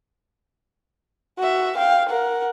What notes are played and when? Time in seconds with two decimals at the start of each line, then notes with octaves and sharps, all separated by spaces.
1.38 F#4 E5
1.78 F5 G5
2.10 A#4 F#5